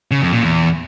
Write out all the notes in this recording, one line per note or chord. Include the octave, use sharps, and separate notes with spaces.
C#3
F2
A#2
E2